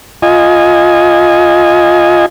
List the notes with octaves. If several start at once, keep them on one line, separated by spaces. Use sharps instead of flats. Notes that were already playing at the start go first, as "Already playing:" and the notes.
F4 D#5 G#5